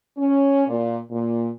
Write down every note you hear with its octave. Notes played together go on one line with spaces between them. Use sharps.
C#4
A#2
A#2